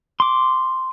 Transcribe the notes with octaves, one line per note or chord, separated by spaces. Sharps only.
C6 D6